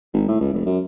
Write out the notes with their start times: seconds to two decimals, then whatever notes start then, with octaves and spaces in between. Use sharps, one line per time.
0.13 G#1
0.28 A2
0.41 C#2
0.53 F1
0.66 F#2